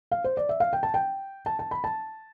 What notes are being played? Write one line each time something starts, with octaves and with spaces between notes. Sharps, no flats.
F5
C5
D5
E5
F5
G5
A5
G5
A5
A5
B5
A5